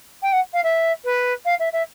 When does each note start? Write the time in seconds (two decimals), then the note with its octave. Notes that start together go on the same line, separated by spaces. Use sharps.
0.22 G5
0.33 F#5
0.54 F5
0.64 E5
1.05 B4
1.45 F5
1.60 E5
1.73 E5